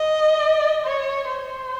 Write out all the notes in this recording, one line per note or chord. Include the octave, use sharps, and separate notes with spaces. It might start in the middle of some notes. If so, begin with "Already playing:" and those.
Already playing: D#5
C#5
C5